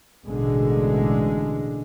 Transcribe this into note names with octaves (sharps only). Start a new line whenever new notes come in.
A1 B2 D3 G#3